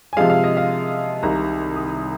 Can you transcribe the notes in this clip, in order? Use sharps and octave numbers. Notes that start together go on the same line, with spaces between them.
G#5
C3 F3 G#3 F5
F5
D#5
F5
C2 C3 D#3 A#5
D#6